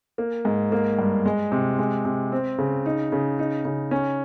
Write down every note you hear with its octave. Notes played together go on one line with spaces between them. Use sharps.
A#3
G#2
A#3
G2
G#3
C3
G#3
C3
C4
C#3
D#4
C#3
D#4
C#3
C#4